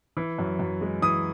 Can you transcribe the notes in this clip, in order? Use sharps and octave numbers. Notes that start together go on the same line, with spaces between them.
E3
F#2
F#2
G#3
E3 D#6